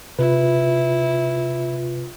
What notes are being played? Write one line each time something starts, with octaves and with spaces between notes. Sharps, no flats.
C3 E4 F4 B4